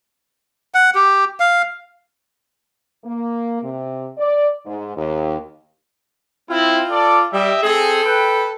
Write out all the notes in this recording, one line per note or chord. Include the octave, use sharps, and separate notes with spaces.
F#5
G4
F5
A#3
C3
D5
G#2
D#2
C4 E4 F4
A4 D5
G3 G4 D#5 E5
C4 G#4 A4
B4 G5